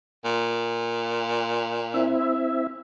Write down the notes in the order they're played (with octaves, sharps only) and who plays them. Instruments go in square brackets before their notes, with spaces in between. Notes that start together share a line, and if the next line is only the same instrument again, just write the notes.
[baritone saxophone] A#2
[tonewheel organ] C4 E4 E5